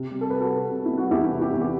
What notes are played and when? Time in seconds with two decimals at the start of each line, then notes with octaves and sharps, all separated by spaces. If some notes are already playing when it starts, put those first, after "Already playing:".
Already playing: C3
0.11 G3
0.21 A4
0.30 G3 B4
0.40 F#4 A4
0.52 C3
0.71 C3
0.85 E4
0.91 G3
0.98 F#4
1.11 E2 E4 G4
1.31 C3
1.41 E4 G4
1.51 E2
1.62 G4